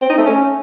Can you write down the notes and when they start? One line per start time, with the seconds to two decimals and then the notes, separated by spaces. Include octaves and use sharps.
0.02 C4
0.10 D#4
0.17 A3
0.25 C#4